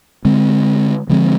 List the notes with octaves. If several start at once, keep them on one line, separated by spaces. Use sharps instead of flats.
D3 G#3 C4
D3 F3 G#3 C4